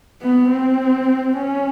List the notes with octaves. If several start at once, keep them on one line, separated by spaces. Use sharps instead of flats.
B3
C4
C#4